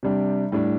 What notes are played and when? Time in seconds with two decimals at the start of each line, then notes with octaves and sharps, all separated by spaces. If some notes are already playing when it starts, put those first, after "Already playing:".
0.03 C3 G3 D4
0.52 A2 G3 D4